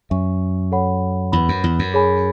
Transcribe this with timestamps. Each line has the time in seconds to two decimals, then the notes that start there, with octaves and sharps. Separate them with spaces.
0.10 F#2 C#5 E5 G#5 C#6
0.72 A4 C#5 F#5 B5
1.32 E2 B4 F#5 B5
1.49 F#2
1.64 E2
1.79 F#2
1.94 G#4 C#5 G#5 B5